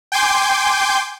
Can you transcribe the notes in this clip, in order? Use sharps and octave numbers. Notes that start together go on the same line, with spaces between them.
G5 G#5 C6 D6 G6